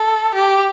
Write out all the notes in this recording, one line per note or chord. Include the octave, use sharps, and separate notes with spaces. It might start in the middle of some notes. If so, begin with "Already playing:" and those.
Already playing: A4
G4